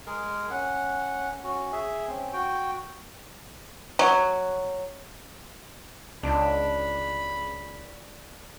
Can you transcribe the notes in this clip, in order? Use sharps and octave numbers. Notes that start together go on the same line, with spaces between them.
G#3 G#4 A#4
C#4 F#5
C#4 F#4
G#4 E5
C4 C#4
F#4 G5
F#3
C#2 D4 B5